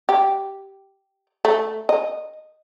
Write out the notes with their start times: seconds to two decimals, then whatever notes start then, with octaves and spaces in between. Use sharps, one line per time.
0.09 G4
1.45 A3
1.89 D#5